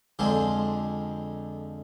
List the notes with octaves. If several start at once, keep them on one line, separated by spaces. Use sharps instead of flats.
F2 D3 F3 G#3